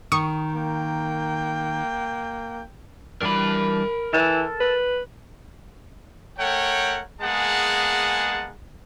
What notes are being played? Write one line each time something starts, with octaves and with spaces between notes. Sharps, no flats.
D#3 C#6 D#6
A#3 G5
E3 G3 D4 A#4 B5
E3 A4
B4
A3 A#4 C#5 F#5 G5
G#3 A#3 B3 G#4 F#5 A5